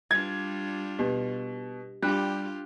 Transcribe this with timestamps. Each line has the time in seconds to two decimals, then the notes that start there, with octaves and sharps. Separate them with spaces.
0.11 G3 D4 F4 G#6
0.99 B2 G4
2.02 G3 D4 F4 G4 F#6